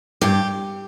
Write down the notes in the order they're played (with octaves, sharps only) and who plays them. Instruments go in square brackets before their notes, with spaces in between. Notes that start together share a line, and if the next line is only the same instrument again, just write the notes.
[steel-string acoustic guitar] G2 G4